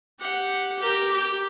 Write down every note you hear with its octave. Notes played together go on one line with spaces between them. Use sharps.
G4 F#5
G4 A#4
G4